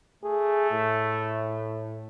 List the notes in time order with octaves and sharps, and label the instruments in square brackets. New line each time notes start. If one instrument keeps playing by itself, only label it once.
[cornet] A3 [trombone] G#4
[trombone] A2